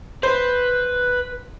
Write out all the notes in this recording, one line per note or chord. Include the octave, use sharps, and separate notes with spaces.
B4 C5